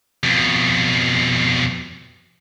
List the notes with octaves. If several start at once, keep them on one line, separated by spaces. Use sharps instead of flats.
F2 B2